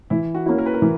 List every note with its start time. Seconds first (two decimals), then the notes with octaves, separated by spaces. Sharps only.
0.10 E3 E4
0.35 F#4
0.46 A#3 C#4 E4
0.58 A#4
0.66 B4
0.74 A#4
0.82 E3